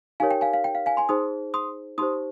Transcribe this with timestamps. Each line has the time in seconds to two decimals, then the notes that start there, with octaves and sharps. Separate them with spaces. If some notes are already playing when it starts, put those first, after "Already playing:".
0.20 D#4 G4 A#4 C#5 F5 G#5
0.31 G5
0.41 F5 G#5
0.53 F5
0.64 G5
0.75 F5
0.86 F5 G#5
0.97 G#5 C6
1.09 D#4 G#4 C5 C6 D#6
1.54 C6 D#6
1.98 D#4 G4 C5 C6 D#6